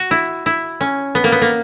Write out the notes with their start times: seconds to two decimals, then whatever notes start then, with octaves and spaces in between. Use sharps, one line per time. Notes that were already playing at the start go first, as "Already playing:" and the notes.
Already playing: F#4
0.11 E4
0.46 E4
0.81 C#4
1.15 B3
1.24 A#3
1.32 B3
1.42 A#3